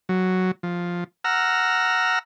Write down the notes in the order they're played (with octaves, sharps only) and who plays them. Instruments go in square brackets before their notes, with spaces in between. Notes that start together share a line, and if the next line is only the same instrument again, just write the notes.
[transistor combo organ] F#3
F3
F#5 A#5 E6 F6